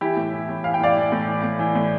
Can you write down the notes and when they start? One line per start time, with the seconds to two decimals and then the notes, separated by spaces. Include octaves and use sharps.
0.01 E3 E4 G4
0.16 A2
0.33 E3
0.49 A2
0.64 E3 F5
0.74 G5
0.80 A2 D5 F5
0.97 E3
1.12 A2
1.28 E3
1.43 A2
1.59 E3
1.75 A2